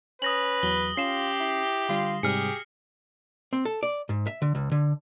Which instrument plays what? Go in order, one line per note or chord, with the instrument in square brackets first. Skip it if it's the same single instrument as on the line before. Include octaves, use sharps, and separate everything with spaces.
[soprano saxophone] C#4 [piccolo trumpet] B4 [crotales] D#6 A#6 F#7
[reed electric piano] E2 F#3 [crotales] G7
[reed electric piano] C#4 [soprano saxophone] F4 [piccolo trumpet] G4 [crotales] C7 E7
[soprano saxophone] E4
[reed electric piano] D3 G3 [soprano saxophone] F4
[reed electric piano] G#2 C3 G3 [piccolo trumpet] G4 [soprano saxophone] G#4 [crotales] F6 C#7
[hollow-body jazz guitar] C4
A4
D5
G#2
E5
D3
C#2
D3